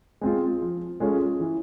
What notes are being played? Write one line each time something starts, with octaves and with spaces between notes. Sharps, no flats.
G#3 C4 F4
F3
G#3 C#4 F4 A4
E3